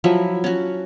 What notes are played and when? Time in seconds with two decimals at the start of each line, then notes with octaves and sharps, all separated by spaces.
0.04 F3 F#3 E4 E5
0.44 C#4 F#4